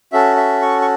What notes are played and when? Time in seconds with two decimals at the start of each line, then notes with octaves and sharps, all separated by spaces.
0.13 C#4 F#4 A4 E5
0.37 E5
0.62 C#6
0.81 C#6